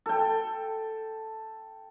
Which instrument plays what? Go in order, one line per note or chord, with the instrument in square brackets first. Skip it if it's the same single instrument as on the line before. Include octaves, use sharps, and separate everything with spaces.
[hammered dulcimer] A4 G5